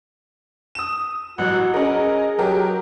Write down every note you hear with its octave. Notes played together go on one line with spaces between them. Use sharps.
D#6 E7
A1 F#3 F#4 F#5
C#4 G#4 A#4 D#5
F#3 G4 A#4